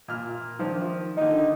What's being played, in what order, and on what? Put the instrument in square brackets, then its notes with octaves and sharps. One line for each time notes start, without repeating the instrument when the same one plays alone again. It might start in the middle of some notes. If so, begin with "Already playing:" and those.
[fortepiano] A#2 F6
D#3 F3 D4
[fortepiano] D3 D#3 [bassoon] D#4